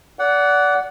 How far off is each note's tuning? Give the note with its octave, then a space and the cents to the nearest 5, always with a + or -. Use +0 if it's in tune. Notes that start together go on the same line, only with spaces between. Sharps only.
D5 -25 F#5 +5